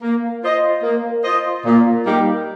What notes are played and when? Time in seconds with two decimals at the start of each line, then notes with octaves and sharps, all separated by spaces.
0.02 A#3
0.43 F4 C5 D#5
0.83 A#3
1.24 F4 C5 D#5
1.65 A#2
2.04 G3 A#3 D#4 G4